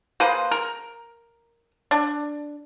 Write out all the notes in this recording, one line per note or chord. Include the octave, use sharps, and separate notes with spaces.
A#3 G#4 B4 C5
A#4
D4